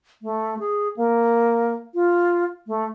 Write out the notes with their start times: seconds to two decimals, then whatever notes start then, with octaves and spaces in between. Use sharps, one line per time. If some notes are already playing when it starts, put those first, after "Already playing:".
0.22 A3
0.59 G#4
0.97 A#3
1.95 F4
2.67 A3